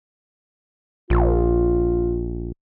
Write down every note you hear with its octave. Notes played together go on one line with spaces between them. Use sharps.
A#1 F4